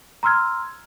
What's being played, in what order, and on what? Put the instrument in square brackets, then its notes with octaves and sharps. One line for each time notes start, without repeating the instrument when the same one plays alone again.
[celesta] A#5 C6 E6 F6 G#6